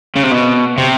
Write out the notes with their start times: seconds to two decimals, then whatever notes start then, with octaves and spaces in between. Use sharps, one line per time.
0.16 C#3
0.24 C3
0.32 B2
0.78 C3